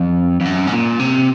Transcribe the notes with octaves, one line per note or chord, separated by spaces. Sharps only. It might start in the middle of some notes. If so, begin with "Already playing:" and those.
Already playing: F2
F2
F#2
G#2
A#2
C3